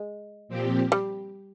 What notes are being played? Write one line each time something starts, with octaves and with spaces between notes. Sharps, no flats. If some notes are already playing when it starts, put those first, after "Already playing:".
Already playing: G#3
A#2 F3 C4 G4
G3